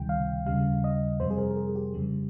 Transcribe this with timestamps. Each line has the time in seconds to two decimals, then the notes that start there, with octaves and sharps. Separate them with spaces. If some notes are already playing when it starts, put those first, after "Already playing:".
Already playing: C#2 C3 D#3 G3 G5
0.09 F5
0.46 D#2 C#3 G3 F5
0.84 D#5
1.20 F2 C3 G3 C5
1.30 G#4
1.38 A#4
1.51 A#4
1.57 G#4
1.76 G4
1.94 F2 C#3 G3